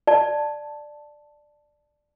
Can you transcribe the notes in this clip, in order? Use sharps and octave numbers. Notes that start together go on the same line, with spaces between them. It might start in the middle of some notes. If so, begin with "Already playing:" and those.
D5 A5